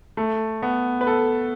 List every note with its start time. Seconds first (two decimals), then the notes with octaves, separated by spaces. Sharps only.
0.17 A3
0.62 B3
1.01 B4
1.07 A4